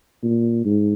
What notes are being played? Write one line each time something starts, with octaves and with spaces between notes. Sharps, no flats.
A#2
G#2